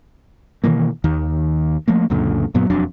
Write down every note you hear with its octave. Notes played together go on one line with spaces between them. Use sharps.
B2 D#3 E3 A#3
D#2 D#3
F3 A3 A#3
C#2 F#2 A#2 D3
F#2 A#2 F#3 B3
E1 F2 F#3 D4